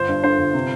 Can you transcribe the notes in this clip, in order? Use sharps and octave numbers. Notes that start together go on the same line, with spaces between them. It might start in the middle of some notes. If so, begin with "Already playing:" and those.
Already playing: G1 C5
G2
D3 C5
G1
C3